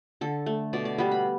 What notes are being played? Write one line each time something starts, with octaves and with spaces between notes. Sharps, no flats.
D3 A4
A3
B2 D5
D5
G3 B3 B4
B5